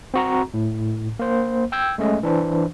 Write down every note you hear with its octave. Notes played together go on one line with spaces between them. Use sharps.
C4 F#4 A#5
A2
A#3 C5
G5 E6 G6 G#6
G#3 A3 C#4 D#5
E3 D4 C5